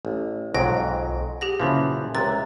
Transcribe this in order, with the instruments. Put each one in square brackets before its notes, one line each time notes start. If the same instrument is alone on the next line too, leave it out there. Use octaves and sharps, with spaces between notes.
[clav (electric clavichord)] A1
[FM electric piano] B1 F4 C5 [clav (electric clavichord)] F2 G#2 F#3 [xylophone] G5 A#6
[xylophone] G4 G#4 A#6 [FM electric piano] F#5
[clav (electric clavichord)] F#2 E3 F3 [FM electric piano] A#2 C#3
[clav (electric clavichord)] C#2 C3 [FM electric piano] A#4 A#5 F#6 [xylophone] A6